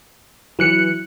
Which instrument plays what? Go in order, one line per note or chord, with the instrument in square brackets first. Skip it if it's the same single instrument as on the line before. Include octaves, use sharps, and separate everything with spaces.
[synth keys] E3 [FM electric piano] F#3 F#6 C#7